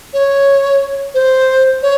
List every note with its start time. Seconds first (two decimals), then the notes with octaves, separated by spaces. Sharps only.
0.13 C#5
1.14 C5
1.82 C#5